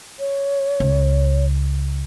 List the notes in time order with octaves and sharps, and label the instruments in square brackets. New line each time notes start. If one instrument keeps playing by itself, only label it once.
[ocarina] C#5
[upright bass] C#2